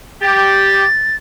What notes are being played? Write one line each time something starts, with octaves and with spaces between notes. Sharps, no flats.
G4 A6